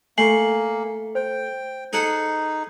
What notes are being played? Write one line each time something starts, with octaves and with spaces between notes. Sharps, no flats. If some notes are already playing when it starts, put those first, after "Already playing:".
A3 A#3 G#5 C7 F#7
C5 G5
D#4 G#4 A4 F#5